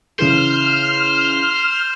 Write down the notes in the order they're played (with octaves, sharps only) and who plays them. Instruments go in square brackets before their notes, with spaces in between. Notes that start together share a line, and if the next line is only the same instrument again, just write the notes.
[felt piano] C#3 E3 G#4 [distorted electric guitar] C5 [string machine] F6